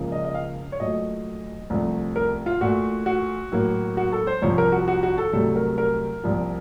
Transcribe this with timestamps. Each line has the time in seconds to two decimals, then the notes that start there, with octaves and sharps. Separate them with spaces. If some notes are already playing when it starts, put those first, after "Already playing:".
Already playing: C#2 C#3 F3 A#3
0.12 D#5
0.24 D#5
0.34 F5
0.72 C#5
0.80 A#2 F#3 A3 D#5
1.70 C2 C3 F3 A3
2.16 A#4
2.46 F4
2.61 A#2 A3 F#4
3.06 F#4
3.52 A2 F#3 A#3
3.97 F#4
4.12 A4
4.27 C5
4.42 C2 C3 F3 C#5
4.58 A#4
4.72 F#4
4.88 F#4
5.03 F#4
5.18 A4
5.33 C2 C3 F#3 A3 A4
5.56 A#4
5.78 A#4
6.24 C2 A#2 F3